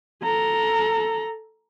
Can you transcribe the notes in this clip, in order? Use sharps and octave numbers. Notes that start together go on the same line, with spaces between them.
A4 A#5